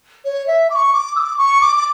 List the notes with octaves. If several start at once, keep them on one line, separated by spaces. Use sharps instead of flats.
C#5
E5
D6
C#6
D6
E6
D6
C#6
D6
D6